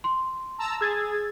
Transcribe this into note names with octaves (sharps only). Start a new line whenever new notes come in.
C6
A5 A#5 E6
G#4 E6 G#6 A6